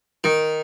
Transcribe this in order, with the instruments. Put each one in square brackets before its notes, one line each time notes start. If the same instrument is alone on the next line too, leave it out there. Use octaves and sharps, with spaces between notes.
[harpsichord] D#3